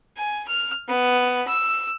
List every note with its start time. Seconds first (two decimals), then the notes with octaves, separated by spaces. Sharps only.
0.17 G#5
0.48 F6
0.88 B3
1.47 E6